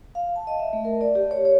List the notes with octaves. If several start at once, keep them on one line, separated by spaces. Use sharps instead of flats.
F5
A5
D#5
E5
A3
A#4
D5
G4
C#5
C#5